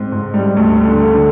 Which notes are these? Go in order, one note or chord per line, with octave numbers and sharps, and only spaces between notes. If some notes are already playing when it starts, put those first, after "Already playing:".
Already playing: G#2 C4
G#2
G3
D2
D3
D3